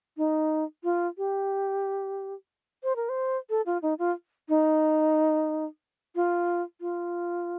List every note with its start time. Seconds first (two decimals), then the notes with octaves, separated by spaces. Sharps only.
0.17 D#4
0.84 F4
1.18 G4
2.83 C5
2.96 A#4
3.09 C5
3.50 A4
3.66 F4
3.82 D#4
3.99 F4
4.49 D#4
6.15 F4
6.81 F4